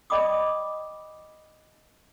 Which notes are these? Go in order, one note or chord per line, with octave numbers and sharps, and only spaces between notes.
D5 D#5 G5 B5 D6 D#6